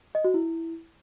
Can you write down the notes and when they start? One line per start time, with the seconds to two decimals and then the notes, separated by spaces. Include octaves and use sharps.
0.15 D#5
0.24 F#4
0.34 E4